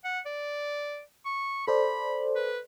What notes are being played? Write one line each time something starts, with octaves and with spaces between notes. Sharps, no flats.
F#5
D5
C#6
A4 C5 D5 B5
B4